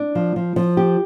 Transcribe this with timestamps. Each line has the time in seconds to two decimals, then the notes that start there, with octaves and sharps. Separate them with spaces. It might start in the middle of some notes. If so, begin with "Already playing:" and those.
Already playing: D4
0.15 F3
0.36 F3
0.56 F3
0.77 G4